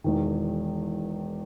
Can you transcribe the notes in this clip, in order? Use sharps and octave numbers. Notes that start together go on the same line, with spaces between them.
E1 E2 D#3